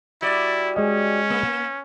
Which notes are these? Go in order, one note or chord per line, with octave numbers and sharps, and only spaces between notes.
G3 E4 F#4 D5
G#3 C#4 D#5
A#3